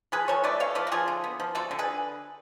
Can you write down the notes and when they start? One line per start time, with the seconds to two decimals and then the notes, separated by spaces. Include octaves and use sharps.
0.12 F3 G#4 B4
0.28 F3 A4 C#5
0.44 A3 B4 D5
0.60 A3 C#5 F5
0.75 F3 B4 D5
0.87 F#4
0.92 F3 F4 G#4
1.08 D3
1.24 B3
1.40 F3
1.55 D3 F#4 A4
1.71 D3
1.79 G#4 B4